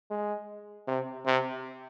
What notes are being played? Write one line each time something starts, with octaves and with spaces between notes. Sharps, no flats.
G#3
C3
C3